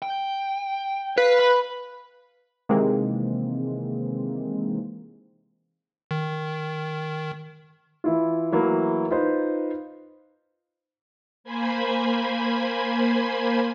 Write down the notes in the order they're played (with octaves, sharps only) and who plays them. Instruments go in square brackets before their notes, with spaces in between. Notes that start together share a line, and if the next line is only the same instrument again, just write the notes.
[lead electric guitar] G5
[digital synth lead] B4 [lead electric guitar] F5
[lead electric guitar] B5
[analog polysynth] C3 D#3 E3 G#3 A#3 C4
[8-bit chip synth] D#3
[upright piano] E3 E4 F4
E3 F#3 A3 A#3 E4
D#4 F4 B4 C5
[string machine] A#3 C5 G#5 B5 G#6